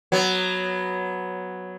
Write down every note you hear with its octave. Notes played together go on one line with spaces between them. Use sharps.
F#3 B3